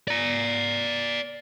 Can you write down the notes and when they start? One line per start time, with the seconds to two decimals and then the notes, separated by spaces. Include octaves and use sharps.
0.08 D5 A#5